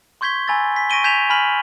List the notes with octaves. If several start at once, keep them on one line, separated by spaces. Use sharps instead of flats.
C6 C#6 G6 G#6 B6 G7
G#5 B5 E6 G#6 A6
B6
C#6 A#6 D7 D#7 G7
G#5 G6 G#6 B6 E7 F7
G#5 B5 F6 B6 F#7